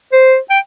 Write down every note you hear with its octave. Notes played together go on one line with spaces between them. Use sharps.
C5
G5